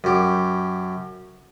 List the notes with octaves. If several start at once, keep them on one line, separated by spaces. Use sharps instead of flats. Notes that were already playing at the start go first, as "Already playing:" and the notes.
F#2 G4